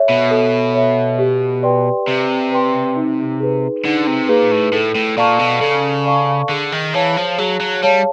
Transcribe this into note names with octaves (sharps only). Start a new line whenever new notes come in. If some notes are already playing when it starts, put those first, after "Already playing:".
Already playing: A4 C#5 E5
B2
A4
C#5 E5
G4
B4 D5 G5 C6
C3 G4
B4 D5 G5 C6
D#4
G#4 B4
D3 D#4
C3
A#2 G#4 B4
A2
A2 A4
A2
A#2 D5 F5 A5 C#6
B2
C#3 A4
D5 F5 A5 C#6
D3 G#4
D#3
E3 C#5 F5 A5
F3
F#3 G#4
F#3
G3 C#5 F5 A5